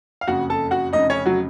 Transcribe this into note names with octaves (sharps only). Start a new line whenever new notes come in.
F5
F#1 F2 C#3 F#4 F#5
A4 A5
F#4 F#5
F1 F2 C#3 D#4 D#5
C#4 C#5
F#3 F#4